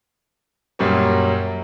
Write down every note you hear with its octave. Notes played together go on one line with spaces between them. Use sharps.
F#2 A#2 F#3 G3 C#4